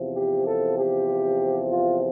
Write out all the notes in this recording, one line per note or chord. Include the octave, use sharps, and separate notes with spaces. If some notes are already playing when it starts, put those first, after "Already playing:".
Already playing: E2 C3 F3
G4
A4
G4
F4